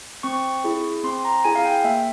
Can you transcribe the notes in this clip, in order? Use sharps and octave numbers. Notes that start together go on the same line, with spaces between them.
C4 C#6
E4 G#4
C4 C6
A#5
E4 G#4 G#5
F5
G5
A#3 E5